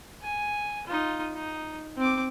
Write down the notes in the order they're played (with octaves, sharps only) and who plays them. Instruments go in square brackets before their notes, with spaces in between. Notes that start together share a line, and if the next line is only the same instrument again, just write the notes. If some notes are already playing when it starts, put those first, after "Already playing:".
[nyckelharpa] G#5
D#4 F4
D#4
C4 D6